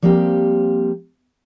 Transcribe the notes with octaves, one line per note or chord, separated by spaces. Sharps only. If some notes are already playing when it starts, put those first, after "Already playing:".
F3 G3 A#3 C4 G4